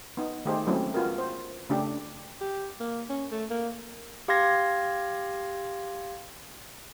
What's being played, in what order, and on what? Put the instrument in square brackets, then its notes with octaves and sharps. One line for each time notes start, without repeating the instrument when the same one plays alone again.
[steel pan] B3 D#4
D#3 A3 D#4 G4 G#4 C5
F#3 G#3 A3 C4 C#4 E4
B3 F4 F#4 G#4 A#4
C5
C#3 A3 C#4 D4 G4
[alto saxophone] G4
A#3
C#4
A3
A#3
[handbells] G4 F5 C6 G#6 A#6